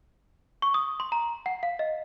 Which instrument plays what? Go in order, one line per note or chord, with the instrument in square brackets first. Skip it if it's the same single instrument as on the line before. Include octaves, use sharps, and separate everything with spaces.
[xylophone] C#6
D#6
C6
A#5
F#5
F5
D#5